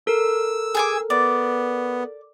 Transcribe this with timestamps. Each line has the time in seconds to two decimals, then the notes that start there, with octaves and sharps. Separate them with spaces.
0.07 A4 A#4 E6
0.75 G#4 G#5 D6
1.10 B3 D5